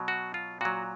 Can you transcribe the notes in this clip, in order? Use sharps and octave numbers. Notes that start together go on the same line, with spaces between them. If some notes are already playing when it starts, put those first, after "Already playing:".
Already playing: B2 F#3
F#4
F4
A#2 F#3 F#4